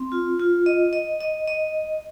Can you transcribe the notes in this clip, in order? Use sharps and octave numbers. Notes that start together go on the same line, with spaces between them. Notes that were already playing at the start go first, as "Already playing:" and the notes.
Already playing: C4
F4
F4
D#5
D#5
D#5
D#5